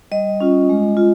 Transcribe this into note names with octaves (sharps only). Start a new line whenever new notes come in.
G3 D#5
C#4 F4
G#3
F4